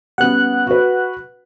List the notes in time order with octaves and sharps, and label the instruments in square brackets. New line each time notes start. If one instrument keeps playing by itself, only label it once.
[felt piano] G3 B3 C#4 [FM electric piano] F#5 F#6
[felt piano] F#4 B4